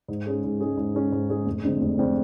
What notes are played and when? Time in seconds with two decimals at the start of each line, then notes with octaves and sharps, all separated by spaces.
0.08 G#2
0.26 G#3 C#4 G#4
0.44 G#2
0.60 G#3 C#4 G#4
0.77 G#2
0.95 G#3 C#4 G#4
1.12 G#2
1.30 G#3 C#4 G#4
1.46 F1
1.63 F2 D3 G#3 D4
1.81 F1
1.99 F2 D3 G#3 D4